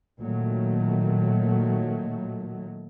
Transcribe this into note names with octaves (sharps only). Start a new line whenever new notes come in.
A#2 D#3 F#3 A3